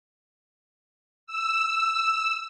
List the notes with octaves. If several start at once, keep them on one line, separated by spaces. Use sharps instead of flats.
E6